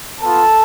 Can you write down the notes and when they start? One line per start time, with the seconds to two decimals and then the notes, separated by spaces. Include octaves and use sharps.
0.20 B3 F4 A4 A5